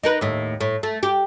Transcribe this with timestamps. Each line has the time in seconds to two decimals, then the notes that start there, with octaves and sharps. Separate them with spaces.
0.03 D#4 A#4 B4
0.21 D#2 A2
0.61 A2
0.83 A3
1.03 G4